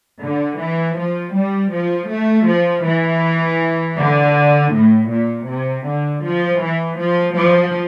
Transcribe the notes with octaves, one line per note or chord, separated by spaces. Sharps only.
D3
E3
F3
G3
F3
A3
F3
E3
D3
A2
A#2
C3
D3
F3
E3
F3
F3